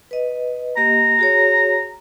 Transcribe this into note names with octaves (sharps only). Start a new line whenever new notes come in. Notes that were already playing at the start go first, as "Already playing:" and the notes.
B4 D#5
A#3 G4 D#5 A#5
F#4 G#4 C#5